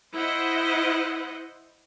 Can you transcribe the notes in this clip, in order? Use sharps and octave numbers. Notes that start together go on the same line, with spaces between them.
E4 C5 D#5 F#5